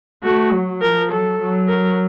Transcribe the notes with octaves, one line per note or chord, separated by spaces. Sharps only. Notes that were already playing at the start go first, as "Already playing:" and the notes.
A3 F#4
F#3
F3 A#4
F#3 A4
F#3
A#4